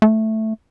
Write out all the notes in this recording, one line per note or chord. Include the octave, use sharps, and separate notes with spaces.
A3